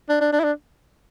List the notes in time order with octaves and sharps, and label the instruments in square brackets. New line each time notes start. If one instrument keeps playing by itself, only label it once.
[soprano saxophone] D4
D4
D4
E4
D4